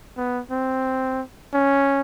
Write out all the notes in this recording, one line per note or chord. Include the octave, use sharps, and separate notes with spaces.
B3
C4
C#4